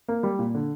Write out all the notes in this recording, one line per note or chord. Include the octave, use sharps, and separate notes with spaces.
A#3
G3
A#2
D3